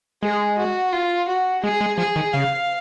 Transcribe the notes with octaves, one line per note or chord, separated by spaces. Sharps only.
G#3 G#4
F#4
F4
F#4
G#3 G#4
G#3
F3 G#4
D#3
C#3 F5